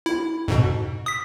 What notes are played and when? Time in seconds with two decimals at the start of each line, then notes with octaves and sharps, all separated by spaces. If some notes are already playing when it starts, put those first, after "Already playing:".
0.06 E4
0.48 F2 G#2 B2
1.06 D#6 B6